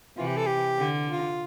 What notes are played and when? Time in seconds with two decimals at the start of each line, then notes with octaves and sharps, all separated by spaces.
0.17 C3 E3 F4
0.27 G4
0.37 A4
0.47 G4
0.78 D3
1.08 F4